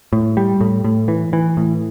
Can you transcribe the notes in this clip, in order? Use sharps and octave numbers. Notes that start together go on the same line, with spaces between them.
A2
G3
A2
A2
E3
E3
A2